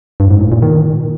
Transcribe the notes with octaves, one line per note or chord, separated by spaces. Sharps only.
G2
G#2
A2
A#2
D#3